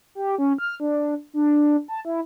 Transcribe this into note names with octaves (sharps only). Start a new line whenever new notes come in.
G4
C#4
F6
D4
D4
A5
E4